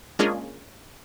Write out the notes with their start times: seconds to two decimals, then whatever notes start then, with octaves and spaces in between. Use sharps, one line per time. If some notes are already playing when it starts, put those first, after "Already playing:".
0.19 G#3 A#3 C#4 D4 F4 G#4